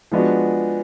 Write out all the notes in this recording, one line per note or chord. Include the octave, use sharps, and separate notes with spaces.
F3 G#3 B3 D4 F#4